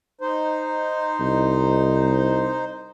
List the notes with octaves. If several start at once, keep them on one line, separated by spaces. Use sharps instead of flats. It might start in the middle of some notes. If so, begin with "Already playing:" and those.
D#4 C5
C2